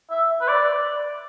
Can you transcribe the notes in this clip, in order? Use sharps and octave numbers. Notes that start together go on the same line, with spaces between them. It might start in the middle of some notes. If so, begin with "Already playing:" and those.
E5
B4
D5